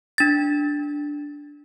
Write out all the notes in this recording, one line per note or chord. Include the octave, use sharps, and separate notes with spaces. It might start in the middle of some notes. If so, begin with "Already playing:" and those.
D4 A6